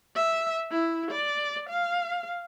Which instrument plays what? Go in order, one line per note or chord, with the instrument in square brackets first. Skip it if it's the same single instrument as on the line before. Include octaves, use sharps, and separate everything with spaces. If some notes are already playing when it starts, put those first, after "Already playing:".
[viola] E5
E4
D5
F5